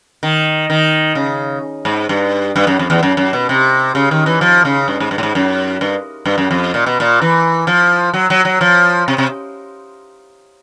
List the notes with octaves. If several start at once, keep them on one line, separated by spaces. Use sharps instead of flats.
D#3
D#3
C#3
G#2
G2
G2
F#2
F2
E2
F#2
F#2
B2
C3
C#3
D#3
E3
F3
C#3
G2
G#2
G2
A2
G#2
F#2
G2
G2
F#2
F2
A#2
B2
A#2
E3
F3
F#3
F#3
F#3
F3
C3
C3